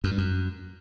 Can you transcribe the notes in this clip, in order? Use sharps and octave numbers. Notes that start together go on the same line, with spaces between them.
F#2
G2
F#2